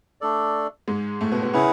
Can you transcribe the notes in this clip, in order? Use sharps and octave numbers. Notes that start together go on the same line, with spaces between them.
A3 D4 A4 D5
G#2 G#3
A2 A3
B2 B3
B2 B3
C#3 C#4 E4 G#4 B4 F#5